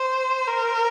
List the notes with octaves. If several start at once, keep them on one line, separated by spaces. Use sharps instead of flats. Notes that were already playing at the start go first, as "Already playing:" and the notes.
Already playing: C5
A#4